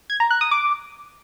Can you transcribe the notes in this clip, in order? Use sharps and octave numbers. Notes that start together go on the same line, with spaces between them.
G#6
A#5
F#6
D#6
D6